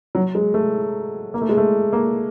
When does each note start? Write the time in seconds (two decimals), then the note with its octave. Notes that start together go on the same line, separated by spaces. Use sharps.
0.15 F#3
0.35 G#3
0.54 A3
1.34 A#3
1.41 A3
1.49 G#3
1.57 A3
1.93 A#3